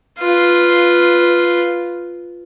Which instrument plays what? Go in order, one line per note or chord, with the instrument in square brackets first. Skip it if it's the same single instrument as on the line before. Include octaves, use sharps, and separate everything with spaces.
[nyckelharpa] F4 B4